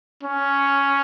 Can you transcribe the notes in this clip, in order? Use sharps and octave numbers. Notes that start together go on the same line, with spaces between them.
C#4